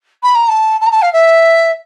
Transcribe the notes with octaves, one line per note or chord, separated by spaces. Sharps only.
B5
A#5
A5
A5
A#5
A5
F5
E5